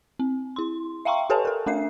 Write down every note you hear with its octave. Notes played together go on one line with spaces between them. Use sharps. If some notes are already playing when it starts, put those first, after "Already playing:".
C4
E4 C6
E5 F5 G5 A#5 C6 C#6
G4 A4 B4 C#5 G#5 A5
A4 A#4
A3 D4 A#4 E5 C7